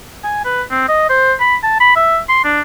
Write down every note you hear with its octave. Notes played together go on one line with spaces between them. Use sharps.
G#5
B4
C4
D#5
C5
B5
A5
B5
E5
C6
D4